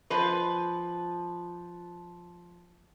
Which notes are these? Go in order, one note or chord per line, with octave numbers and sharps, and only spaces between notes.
F3 B4